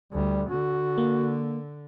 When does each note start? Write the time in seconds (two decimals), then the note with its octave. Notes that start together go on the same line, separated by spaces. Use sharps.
0.13 D2 G3
0.50 D3 F#4
0.98 A#3